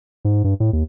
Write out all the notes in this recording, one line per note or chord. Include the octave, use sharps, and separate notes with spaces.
G#2
G2
A2
D#2